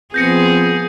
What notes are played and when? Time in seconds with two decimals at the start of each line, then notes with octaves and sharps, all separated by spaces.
0.14 F3 B3 C4 G#4 G6 A#6 C#7